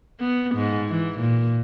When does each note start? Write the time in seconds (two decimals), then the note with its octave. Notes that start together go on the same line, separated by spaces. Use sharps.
0.20 B3
0.55 G#2
0.89 E3
1.19 A#2